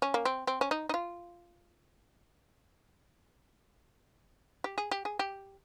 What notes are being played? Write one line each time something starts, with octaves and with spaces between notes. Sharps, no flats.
C#4
A#3
C4
C4
C#4
D#4
D#4
F4
G4
G#4
G4
G#4
G4